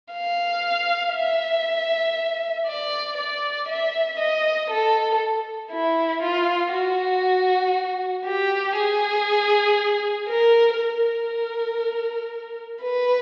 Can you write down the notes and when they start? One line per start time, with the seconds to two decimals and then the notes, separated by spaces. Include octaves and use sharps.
0.12 F5
1.14 E5
2.67 D5
3.17 D5
3.69 E5
4.19 D#5
4.70 A4
5.71 E4
6.22 F4
6.73 F#4
8.26 G4
8.77 G#4
10.29 A#4
10.79 A#4
12.82 B4